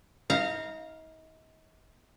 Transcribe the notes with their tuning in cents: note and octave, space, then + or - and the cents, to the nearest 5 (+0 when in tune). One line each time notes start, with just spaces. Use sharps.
D#4 +40 F5 +0 A#5 -20